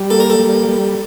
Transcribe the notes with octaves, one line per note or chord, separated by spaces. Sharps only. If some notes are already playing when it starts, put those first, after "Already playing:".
Already playing: G3
A#3 A4
A#4
A4
G3
G3